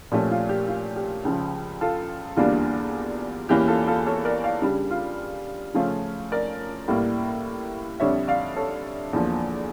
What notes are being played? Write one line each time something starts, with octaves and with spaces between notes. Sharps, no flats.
A#2 F3 A3 C#4 G4
F4
G4
F4
G4
C#2 C#3 F3
F4 A4
E2 D3 G3 A#3 D4 F4
E2 E3 A#3 C#4 G4
F4 A4
F4 A4
A4 C#5
A#4 D5
D5 F5
C#3 G3 D4 G4
F4
C#3 F3 A3 C#4 F4
A#4 D5
A2 G3 A#3
F2 D3 G3 D4 C#5 E5
D5 F5
A4 C#5
E2 D3 F3 A#3